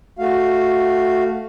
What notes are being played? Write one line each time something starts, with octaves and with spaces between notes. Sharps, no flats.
A3 F#4 F5